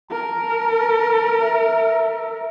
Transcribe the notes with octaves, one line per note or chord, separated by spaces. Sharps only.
A#4 A5
E5